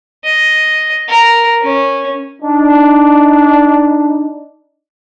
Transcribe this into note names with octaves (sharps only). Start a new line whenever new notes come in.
D#5
A#4
C#4
D4 D#4